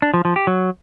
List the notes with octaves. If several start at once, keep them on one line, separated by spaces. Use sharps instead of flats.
D4
F3
F3
G4
F#3